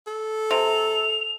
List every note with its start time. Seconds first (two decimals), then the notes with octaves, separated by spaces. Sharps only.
0.07 A4
0.51 C3 F7